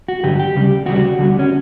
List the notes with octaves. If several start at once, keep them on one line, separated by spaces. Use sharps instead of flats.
F#4
G2 D3 F#3 G4
G4
D2 C#3 G3
D2 C#3 G3 F#4
D2 D3 G3
C#4